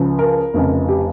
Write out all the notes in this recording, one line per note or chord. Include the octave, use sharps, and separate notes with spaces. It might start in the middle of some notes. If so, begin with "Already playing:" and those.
Already playing: C#2 C#3 F3
A#4
F1 F2 C#3
G4